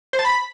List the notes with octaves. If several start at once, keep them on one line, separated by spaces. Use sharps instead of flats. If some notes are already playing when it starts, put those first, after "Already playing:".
C5
A5
B5